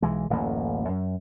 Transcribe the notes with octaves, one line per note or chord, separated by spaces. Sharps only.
B1 E3 G#3
D1 A1 F#2 A#3
F#2